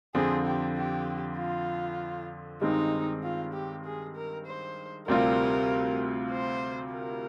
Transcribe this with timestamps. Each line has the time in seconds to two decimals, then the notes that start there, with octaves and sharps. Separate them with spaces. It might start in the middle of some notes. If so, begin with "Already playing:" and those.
0.15 F2 D3 F3 C4 G#4
0.46 G4
0.76 G4
1.37 F4
2.61 G2 D#3 G#3 C4 D#4
3.23 F4
3.53 G4
3.85 G#4
4.16 A#4
4.46 C5
5.08 D2 C3 G3 C4 F4 A#4
6.31 C5
6.94 A#4